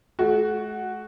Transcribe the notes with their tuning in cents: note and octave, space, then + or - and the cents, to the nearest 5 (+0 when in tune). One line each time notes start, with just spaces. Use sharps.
A3 -45 F#4 +0